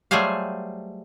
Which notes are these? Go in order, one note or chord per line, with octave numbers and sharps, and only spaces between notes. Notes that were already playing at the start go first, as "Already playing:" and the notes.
F#3 G3 A3 G#4 C5 F5